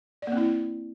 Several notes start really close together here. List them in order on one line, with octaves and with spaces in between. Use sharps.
D5 A#3 C4 E4